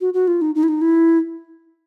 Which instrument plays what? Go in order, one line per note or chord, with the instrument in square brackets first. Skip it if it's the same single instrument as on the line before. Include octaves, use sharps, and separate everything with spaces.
[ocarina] F#4
F#4
F4
D#4
D#4
E4
D#4
E4